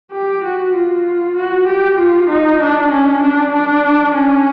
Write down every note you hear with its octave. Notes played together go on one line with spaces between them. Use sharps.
G4
F#4
F4
F#4
G4
F4
D#4
D4
C#4
D4
D4
C#4